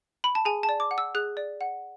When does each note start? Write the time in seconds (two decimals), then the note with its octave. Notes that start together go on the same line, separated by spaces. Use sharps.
0.24 B5
0.35 A5
0.45 G#4 G#5
0.63 A5
0.69 D5
0.80 D6
0.91 F#5
0.98 E6
1.15 G#4 F#6
1.37 D5
1.61 F#5